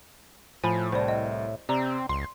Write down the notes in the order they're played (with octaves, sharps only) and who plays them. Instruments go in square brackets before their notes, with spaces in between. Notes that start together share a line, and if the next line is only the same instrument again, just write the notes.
[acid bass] A2 [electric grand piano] F3 [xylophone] G#5 B5
[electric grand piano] C2 [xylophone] C5 D5
[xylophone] D#5
[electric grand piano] C3 [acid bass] C4 [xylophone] D5 A#5
[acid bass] C#2 [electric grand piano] C6